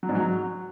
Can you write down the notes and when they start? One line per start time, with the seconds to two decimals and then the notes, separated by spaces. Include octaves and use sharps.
0.03 F#3
0.09 G#2
0.15 F#3